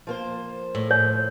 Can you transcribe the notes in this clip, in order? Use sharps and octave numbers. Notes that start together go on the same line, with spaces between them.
F3 A#3 C5
A2
C#5